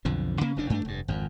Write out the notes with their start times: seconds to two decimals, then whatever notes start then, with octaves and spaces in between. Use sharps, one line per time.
0.05 B1 F2 D3 F3
0.41 C#3 A#3 C#4
0.56 F1 F2 C#3 D4
0.70 G2 A3 C4 D4
0.85 F1 G2
1.08 G#1 F2